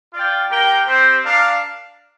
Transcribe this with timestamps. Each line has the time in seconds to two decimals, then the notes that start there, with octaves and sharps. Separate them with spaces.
0.14 F4 D5 G5
0.50 A#3 G4 A#4 G5
0.87 C4 G4 C5
1.23 D4 A#4 F5